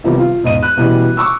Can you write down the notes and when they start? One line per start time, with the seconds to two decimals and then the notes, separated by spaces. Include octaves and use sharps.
0.04 C3 D#3 F3 G3 B3
0.19 F4
0.43 E1 G#2 D#5 D#7
0.63 F#6
0.77 B2 E3 G3 C#4 F#4
1.17 C#6 D6 E6